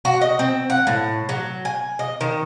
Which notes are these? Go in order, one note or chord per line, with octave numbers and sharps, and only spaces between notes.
F#4
D#5
C4
F#5
A2
F#3
G#5
D#5
D#3